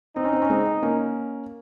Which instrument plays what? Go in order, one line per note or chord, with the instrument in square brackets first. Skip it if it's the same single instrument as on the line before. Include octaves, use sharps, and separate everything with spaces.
[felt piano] C4 [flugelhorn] D#4
[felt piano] C#4
C4
C#4
G#3 C4
A#3 C#4